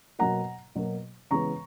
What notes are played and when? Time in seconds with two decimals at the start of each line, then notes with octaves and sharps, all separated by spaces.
0.19 B2 F#3 A#3 F#5 A#5
0.75 B2 F#3 A#3
1.30 C#3 E3 G#3 B3 A#5 C#6